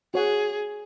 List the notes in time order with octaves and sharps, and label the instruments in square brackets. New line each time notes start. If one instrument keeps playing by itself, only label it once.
[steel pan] F#4 C#5 F#5 [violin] G#4